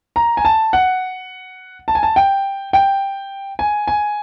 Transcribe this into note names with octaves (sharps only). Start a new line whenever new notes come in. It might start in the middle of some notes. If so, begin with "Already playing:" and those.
A#5
G#5
A5
F#5
A5
G#5
A5
G5
G5
G#5
G#5